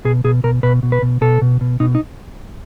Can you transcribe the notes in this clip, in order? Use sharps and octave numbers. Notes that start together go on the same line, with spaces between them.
B2 G#4
B2 G#4
B2 A#4
B2 B4
B2
B4
B2
B2 A4
B2
B2
B2 D#4
D#4